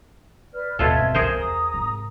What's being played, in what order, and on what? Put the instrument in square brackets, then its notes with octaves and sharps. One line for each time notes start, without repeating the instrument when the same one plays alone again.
[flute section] B4 D5 F6
[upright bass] G1 D#2 [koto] B2 F4 A4 [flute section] E5 G#6
[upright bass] C4 D#4
[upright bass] C2 F#2 [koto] G#4 A#4 C5
[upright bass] E2 [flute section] A#5 D#6
[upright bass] G#2 C3